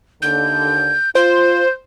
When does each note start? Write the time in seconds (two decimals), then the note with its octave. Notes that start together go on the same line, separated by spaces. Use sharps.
0.22 D#2 D3 G6
1.15 F4 C5 G6